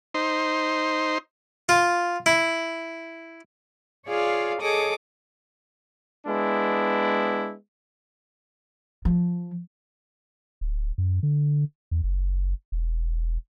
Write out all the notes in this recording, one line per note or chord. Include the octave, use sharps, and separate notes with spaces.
D#4 C5
F4
E4
F4 G#4 C#5 D5 F5
G#4 A4 C#5 D#5 D6 D#6
G#3 B3 D4 E4
F3
D1
F#2
D3
E2
F#1
E1